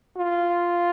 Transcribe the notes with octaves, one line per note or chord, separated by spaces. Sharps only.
F4